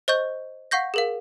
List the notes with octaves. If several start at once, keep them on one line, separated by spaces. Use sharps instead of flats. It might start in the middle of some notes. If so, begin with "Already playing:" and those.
C5 D#5 C#6 G6
F5 F#5 C#6 G6 A#6
G#4 A#4 F5